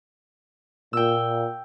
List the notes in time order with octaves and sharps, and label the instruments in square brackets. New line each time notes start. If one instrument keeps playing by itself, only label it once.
[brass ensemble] A#2 [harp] G5 E6